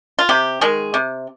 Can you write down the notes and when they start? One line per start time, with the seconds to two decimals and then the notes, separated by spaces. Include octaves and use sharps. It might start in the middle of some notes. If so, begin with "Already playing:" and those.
0.19 F4
0.29 C3 G4
0.61 D#3 G#3 G#4
0.94 C3